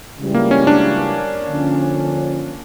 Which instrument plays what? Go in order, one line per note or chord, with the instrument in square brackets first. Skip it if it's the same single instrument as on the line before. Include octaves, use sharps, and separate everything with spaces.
[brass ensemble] C#2 C#3 E3 G3
[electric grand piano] A#3
C#4
D4
[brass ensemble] D3 F3 C#4